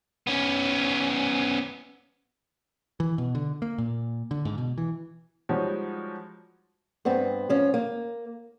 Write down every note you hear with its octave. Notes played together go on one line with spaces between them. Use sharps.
B3 C#4
E3
B2
D3
A#3
A#2
D3
G#2
B2
E3
F3 G3 G#3 D#4 F#4 C#5
G2 B3 C4
G#2 F3 C#4
A#3